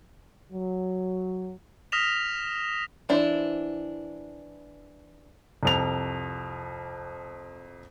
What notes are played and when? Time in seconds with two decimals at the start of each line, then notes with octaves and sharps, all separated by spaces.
0.52 F#3
1.92 D#6 F6 A#6 B6 E7 F7
3.09 E3 D4 E4 C5
5.63 C2 F2 F7